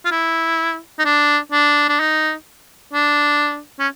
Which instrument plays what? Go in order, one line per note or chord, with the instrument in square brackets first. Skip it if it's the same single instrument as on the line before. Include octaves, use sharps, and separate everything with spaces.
[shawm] F4
E4
D#4
D4
D4
D4
D#4
D4
C#4